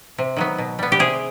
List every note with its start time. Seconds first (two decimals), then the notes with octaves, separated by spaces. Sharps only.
0.18 C3
0.37 D#3 F#3 B3
0.58 B2
0.79 G3 B3
0.92 G4
0.99 C3 G#4